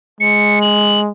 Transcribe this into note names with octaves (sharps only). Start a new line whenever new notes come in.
G#3 C#7
F#7